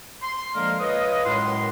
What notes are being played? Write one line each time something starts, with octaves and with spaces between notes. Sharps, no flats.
C6
D3 F3 G#3 A#3 A#4
F4 B4 C#5 D#5
F#2 A2 G#3 A#4 F#5 C6